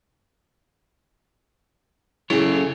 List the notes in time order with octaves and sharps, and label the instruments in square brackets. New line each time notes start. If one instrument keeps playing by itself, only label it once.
[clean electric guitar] F#2 C#3 C#5 [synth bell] E4 [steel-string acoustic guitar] G#4 A4